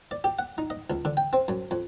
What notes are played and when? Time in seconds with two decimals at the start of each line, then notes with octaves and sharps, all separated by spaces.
0.11 D5
0.24 G4
0.39 F#5
0.58 D#4
0.70 D#5
0.90 C#2
1.05 D3
1.17 G5
1.33 C4
1.48 F#2
1.71 F2